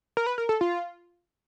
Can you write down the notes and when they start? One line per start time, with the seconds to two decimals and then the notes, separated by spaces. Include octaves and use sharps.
0.17 A#4
0.27 B4
0.38 A#4
0.49 A4
0.61 F4